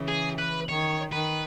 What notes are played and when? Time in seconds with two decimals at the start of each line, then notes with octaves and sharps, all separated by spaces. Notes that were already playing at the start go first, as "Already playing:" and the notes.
Already playing: C#3 E3
0.08 G#4
0.38 B4
0.68 D#3 C#5
1.12 D#3 B4